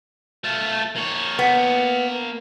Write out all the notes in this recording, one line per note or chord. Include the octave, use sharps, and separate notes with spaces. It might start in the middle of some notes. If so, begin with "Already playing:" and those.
A3 F4
A#3 C#5
B3